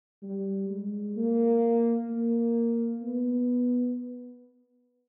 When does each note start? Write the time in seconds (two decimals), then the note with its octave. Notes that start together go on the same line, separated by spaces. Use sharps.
0.23 G3
0.70 G#3
1.17 A#3
2.10 A#3
3.02 B3